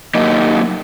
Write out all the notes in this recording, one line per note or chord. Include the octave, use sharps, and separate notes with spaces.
F#3 A#3 D#4 G4 A#4 D#5